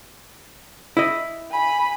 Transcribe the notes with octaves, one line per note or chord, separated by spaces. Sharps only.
E4 D#5
G#5 B5